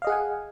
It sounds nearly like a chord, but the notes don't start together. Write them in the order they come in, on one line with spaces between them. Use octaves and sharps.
F5 D#5 G#4 F#5 G#5